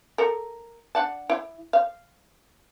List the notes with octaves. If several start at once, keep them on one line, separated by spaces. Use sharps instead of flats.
A4 A#4
D4 F#5 A5
E4
F5